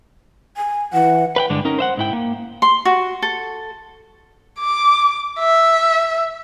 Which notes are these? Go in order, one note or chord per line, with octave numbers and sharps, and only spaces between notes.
G#5
E3 F#5
B4 F#5 G5
G2 D3 G#3 D4
C#4 D#4 A#4
C5 E5 F#5
G#2 E4 G5
A#3
C6
F#4
A4
D6
E5